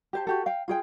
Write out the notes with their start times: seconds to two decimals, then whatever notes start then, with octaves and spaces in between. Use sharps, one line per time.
0.13 G4 C5 A5
0.27 F#4 G4 A4
0.46 F5 G5
0.68 F4 G#4 G5